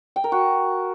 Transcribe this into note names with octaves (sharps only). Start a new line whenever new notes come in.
G5
A#4
F#4